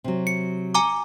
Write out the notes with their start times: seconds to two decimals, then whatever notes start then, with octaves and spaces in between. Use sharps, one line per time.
0.04 C3 F#3
0.27 C#7
0.75 G#5 A#5 D6